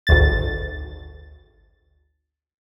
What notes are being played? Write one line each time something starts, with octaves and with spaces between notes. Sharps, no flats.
G#1 D2 A6